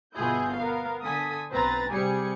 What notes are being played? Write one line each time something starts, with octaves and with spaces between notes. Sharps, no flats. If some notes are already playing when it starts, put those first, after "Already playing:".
G1 B2 E4 F4 G#4 G6
B3 A#4 F5
D3 A4 G#5 D#6 B6
B1 C4 B4 C5 A#5 A6
C3 G3 G4 G#4 G#5 C#7